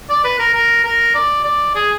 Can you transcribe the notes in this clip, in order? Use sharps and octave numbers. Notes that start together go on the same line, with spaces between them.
D5
B4
A#4
A#4
A#4
D5
D5
G#4